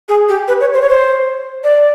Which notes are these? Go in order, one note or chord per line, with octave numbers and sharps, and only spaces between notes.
G#4
G4
B4
C#5
C5
C#5
C5
D5